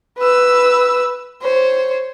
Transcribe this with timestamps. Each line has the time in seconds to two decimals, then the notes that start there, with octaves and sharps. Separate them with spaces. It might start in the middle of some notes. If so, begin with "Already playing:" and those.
0.18 B4 E6
1.42 C5 C#5